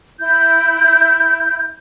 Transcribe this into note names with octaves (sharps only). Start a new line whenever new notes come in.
E4 G6